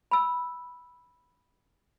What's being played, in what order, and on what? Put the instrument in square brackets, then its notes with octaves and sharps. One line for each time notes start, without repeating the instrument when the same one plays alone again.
[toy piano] B5 E6